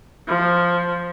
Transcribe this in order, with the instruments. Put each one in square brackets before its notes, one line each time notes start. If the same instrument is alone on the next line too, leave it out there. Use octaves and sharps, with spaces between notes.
[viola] F3